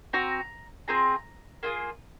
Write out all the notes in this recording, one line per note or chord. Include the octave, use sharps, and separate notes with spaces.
C4 F#4 A#5
C4 F4 G#4 A#5
A#3 F4 G#4